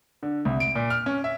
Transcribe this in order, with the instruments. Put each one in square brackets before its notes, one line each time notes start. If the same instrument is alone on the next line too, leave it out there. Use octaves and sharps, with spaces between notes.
[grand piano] D3
C2
D7
A#2
F6
C#4
E5